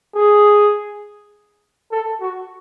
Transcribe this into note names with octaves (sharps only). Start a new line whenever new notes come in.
G#4
A4
F#4